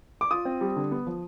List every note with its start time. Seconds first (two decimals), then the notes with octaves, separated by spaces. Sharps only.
0.21 D6
0.31 F4 D#6
0.45 C4
0.61 G3
0.76 D3
0.91 B3
1.07 F3